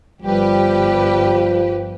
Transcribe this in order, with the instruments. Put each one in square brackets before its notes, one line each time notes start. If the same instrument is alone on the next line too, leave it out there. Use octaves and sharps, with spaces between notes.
[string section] G1 G4 B4 [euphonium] F3 [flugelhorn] G3